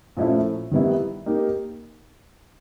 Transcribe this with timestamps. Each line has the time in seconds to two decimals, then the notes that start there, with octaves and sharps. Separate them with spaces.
0.17 A#2 F3 A3 C#4 E4
0.72 D#3 G3 B3 E4
1.26 A#3 D#4 G4 A#4